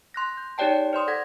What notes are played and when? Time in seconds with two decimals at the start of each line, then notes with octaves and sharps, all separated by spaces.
0.14 C6 F#6 A#6
0.37 G6
0.58 D#4 G4 C#5 D5 G5 A5
0.93 C5 D5 C6 D#6
1.07 A4 F#5 G#6 A#6